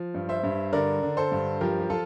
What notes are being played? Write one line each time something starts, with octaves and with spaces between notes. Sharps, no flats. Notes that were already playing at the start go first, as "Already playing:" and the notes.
Already playing: F3
G2
C5 E5
G2
D3 A#4 D5
D3
A4 C5
G2
F3 G4 A#4
G4
F3 F4 A4